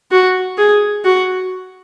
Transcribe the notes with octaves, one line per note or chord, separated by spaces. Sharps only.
F#4
G#4
F#4